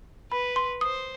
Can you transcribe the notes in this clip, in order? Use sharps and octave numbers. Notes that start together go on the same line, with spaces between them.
B4 B5
C6
C5 D#6